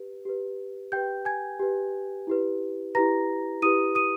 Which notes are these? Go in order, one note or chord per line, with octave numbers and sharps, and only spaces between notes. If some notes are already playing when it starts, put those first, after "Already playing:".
Already playing: G4 B4
G4 B4
G4 B4 G5 G6
G#5 G#6
G4 B4
E4 G4 B4
E4 G4 B4 A#5 A#6
E4 G4 B4 D#6 D#7
D#6 D#7